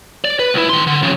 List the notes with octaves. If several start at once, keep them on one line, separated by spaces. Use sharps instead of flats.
D5
B4
C#2 E4
D#3 C6
D3
F2 C#3